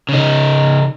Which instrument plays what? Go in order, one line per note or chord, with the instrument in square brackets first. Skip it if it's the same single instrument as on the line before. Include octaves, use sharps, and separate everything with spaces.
[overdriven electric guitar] C#3 D#4